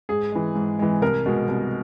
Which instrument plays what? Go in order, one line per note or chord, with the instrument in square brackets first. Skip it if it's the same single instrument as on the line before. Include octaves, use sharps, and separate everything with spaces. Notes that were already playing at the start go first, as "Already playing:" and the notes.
[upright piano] G#2 G#4
E3 G#3
G#2
E3 G#3
C2 A#4
B2 G#3
C2